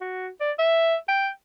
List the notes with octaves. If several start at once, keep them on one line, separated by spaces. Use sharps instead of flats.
F#4
D5
E5
G5